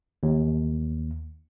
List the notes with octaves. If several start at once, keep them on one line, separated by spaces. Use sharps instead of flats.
D#2